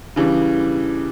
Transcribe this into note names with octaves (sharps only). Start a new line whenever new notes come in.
C#3 E3 G3 D4